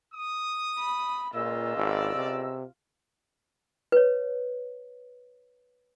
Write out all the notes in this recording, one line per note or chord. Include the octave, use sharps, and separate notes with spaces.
D#6
B5
C#2 A#2 F4 D#5 E6
G#1 D5
C3
B4 C#5